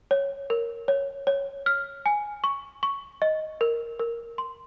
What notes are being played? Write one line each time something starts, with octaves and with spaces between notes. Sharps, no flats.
C#5
A#4
C#5
C#5
F6
G#5
C#6
C#6
D#5
A#4
A#4
C6